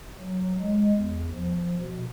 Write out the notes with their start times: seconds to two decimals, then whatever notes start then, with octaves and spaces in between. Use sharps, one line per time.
0.19 F#3
0.60 G#3
0.97 E2
1.33 F3
1.79 B2